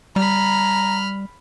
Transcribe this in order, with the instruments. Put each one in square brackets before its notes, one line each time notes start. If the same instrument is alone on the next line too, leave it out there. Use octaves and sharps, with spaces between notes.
[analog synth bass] G3 [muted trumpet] A#5 [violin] B5 F6